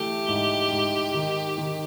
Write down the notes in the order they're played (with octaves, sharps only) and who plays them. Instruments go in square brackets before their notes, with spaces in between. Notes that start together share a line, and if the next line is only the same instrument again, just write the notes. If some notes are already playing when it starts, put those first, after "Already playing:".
Already playing: [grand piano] E3 A3 [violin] G4
[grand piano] G#2
G#2
D#3
D#3